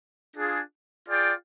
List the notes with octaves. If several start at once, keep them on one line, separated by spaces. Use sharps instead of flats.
D4 F4 G#4
F4 G#4 D5 G5